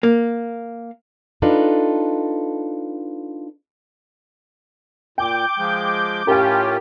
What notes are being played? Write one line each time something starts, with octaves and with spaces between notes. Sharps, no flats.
A#3
D4 D#4 F4 A4 B4
A#2 G5 D6 G6
F3 G#3
A2 C#4 F4 G4 A#4 G5